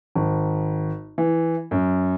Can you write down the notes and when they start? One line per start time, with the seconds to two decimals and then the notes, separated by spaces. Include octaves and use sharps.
0.15 G#1
1.18 E3
1.71 F#2